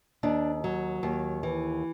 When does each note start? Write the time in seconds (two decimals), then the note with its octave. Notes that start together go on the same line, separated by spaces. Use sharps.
0.23 D#2 D4
0.64 F#3
1.03 D#2
1.43 E3